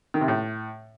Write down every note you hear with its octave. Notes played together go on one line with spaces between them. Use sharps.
D#3
C3
A2